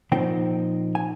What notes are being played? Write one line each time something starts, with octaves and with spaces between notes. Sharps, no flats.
A#2 F3 C4 D#4 G5
G#5